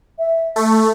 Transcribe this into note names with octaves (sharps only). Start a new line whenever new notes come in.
E5
A3